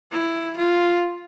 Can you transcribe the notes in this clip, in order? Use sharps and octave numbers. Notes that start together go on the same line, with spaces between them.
E4
F4